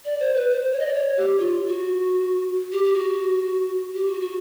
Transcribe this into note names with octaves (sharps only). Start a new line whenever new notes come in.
D5
C5
B4
C5
C#5
D#5
D5
C#5
G4
F4
F#4
G4
G4
F#4
G4
F#4
F#4